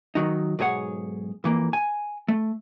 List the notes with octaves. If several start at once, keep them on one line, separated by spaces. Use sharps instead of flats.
D#3 F3 F#3 D#4
B1 G#2 G#4 C#5 F#5
F2 E3 A#3
G#5
A3